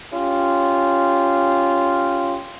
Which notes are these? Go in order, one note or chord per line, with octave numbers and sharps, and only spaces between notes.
C#4 F4 G4